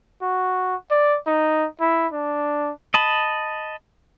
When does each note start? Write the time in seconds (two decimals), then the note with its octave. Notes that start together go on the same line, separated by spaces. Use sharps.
0.22 F#4
0.91 D5
1.27 D#4
1.80 E4
2.13 D4
2.94 D#5 A5 B5